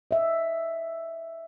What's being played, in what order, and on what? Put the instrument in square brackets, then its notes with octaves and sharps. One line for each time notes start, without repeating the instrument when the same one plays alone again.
[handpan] D#5 E5